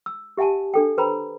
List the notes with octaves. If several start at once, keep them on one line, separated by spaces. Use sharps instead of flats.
E6
G4 E5 F#5 G#5 A5
D4 A4 G5
B4 C5 G5 A#5 B5